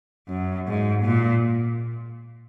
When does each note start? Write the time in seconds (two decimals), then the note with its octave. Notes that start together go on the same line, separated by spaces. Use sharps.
0.29 F#2
0.67 G#2
1.05 A#2